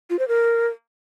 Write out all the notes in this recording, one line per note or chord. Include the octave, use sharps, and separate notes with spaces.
F4
C5
A#4